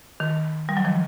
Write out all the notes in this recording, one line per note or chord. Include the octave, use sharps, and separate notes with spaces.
D#3
G3
F#3
D#3 F3